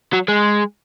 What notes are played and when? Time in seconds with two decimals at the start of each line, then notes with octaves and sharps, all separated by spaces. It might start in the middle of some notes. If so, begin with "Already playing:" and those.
0.13 F#3
0.28 G#3